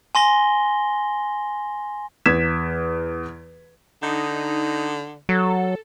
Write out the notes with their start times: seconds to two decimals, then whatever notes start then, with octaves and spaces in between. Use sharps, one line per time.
0.15 G#5 C6 A#6 G7
2.26 E2 G#6 B6 E7
4.03 D3 D#4
5.29 F#3 A4